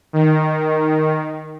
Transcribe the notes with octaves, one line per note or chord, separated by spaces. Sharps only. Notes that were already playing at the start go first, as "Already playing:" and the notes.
D#3